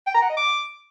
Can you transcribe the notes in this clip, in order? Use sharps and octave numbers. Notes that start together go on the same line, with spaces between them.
G5
A#5
F#5
D#5
D6